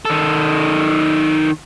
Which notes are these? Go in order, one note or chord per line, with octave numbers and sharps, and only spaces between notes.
D#3 A4